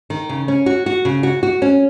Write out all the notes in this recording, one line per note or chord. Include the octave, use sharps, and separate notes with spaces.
D#3
C#3
C#4
F#4
F#4
C#3
F#4
F#4
C#4